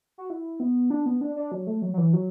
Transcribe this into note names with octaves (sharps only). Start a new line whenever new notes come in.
F#4
E4
B3
D4
B3
D4
D4
F#3
A3
F#3
F#3
E3
F#3